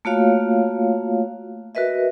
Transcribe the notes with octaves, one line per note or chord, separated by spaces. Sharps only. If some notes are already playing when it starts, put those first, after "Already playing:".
A3 A#3 F4 F#4 C#5 F5
F#4 A#4 B4 D#5 E5